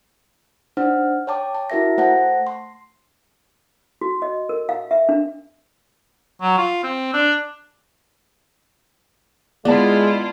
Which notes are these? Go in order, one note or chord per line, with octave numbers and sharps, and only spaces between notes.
D4 D#4 C5 F#5 F6
C#5 G5 A5 D6
A5
E4 F#4 A#4 E5 A#6
A3 C5 F#5 A5 A#6
C6
F#4
D#5
A#4
F5
E5
D4
F#3
F4
C4
D4
G#3 B3 E4 F4 D5 A5